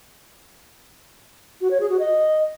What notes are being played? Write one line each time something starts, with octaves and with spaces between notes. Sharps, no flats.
F#4
C#5
G#4
F#4
D#5